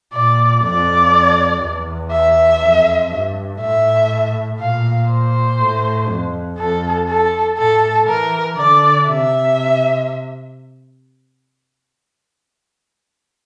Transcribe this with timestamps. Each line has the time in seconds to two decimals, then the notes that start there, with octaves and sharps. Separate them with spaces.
0.13 A#2 D5
0.63 F2 D5
1.63 E2
2.12 E5
2.62 F2
3.11 G2
3.61 A2 E5
4.60 A#2 F5
5.09 C5
5.60 A2
6.09 F2
6.58 F2 A4
7.08 A4
7.58 A2 A4
8.07 E3 A#4
8.57 D3 D5
9.08 C3 E5